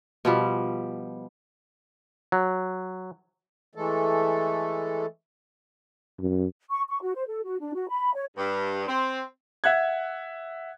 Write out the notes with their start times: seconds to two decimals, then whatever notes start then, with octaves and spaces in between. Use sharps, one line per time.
0.25 B2 F3 G3
2.32 F#3
3.75 E3 G#3 A3 A4
6.19 F#2
6.70 C#6
6.89 C#6
7.02 F#4
7.15 C5
7.27 A4
7.45 F#4
7.60 D4
7.74 F#4
7.89 B5
8.14 C#5
8.36 G2
8.87 C4
9.64 E5 F#5 F#6 G#6